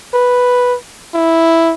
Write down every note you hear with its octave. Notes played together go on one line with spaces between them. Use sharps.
B4
E4